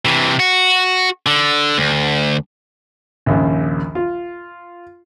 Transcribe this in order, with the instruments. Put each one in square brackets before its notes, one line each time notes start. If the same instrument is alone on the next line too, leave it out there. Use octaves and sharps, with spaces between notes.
[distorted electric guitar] C3 E3
F#4
D3
D2
[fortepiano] A#1 D#2 C#3
F4